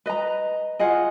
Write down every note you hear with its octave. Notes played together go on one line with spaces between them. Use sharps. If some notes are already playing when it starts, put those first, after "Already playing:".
B4 D#5 A#5
F4 G#4 D#5 F#5